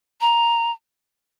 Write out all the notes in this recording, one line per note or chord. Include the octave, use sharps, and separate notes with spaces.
A#5